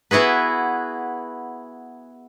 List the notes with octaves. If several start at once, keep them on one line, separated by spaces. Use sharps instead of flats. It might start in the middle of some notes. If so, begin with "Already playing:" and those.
B3 E4 F#4 G#4 B4